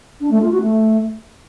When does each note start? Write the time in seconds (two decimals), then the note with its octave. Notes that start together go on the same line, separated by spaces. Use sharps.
0.21 D4
0.31 A3
0.41 F4
0.51 F#4
0.62 A3